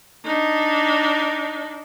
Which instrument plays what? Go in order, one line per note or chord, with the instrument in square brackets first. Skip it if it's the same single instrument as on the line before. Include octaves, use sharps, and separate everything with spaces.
[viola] D4 D#4